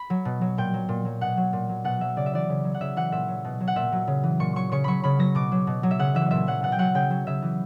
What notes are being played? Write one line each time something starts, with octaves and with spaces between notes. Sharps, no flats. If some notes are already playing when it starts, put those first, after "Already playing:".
Already playing: B5
F#3
B2
F#3
A#2 G5
F#3
A#2
F#3
B2 F#5
F#3
A#2
F#3
B2 F#5
F#3 E5
C#3 D5
E5
E3 D5
C#3
F#3
F#5
C#3 E5
E3 F#5
A#2 E5
F#3
B2
F#3
F#5
A#2 E5
F#3
C#3
E3
A#2 C#6
F#3 C#6
C#3 C#6
F#3 B5 C#6
C#3 B5
F#3 A#6
B2 D6
F#3
B2
F#3
E5
C#3 F#5
E3 E5
A#2 E5
F#3 F#5
B2 F#5
G5
F#3 F#5
C#3 G5
F#3
C#3 E5
E3